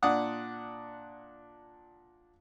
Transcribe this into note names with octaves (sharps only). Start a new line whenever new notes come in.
A#2 D4 F#5 D#6